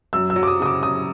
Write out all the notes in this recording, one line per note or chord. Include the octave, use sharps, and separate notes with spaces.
F#2 E6
E6
F#3
D6
D#6
C#3 D#6
D6
F#2 D#6